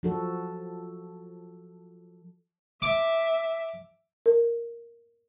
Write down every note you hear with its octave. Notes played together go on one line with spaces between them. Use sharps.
F3 F#4 A4
E5 D6
A#4